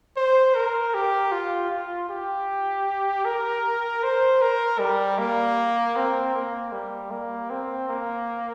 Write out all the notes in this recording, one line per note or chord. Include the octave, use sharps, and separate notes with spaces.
C5
A#4
G4
F4
F4
G4
A#4
C5
A#4
G3
A#3
C4
A#3
G3
A#3
C4
A#3